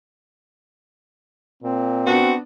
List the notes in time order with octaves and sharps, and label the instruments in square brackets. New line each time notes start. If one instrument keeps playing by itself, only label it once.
[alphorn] A#2 [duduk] C4
[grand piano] B3 D4 [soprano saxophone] F#4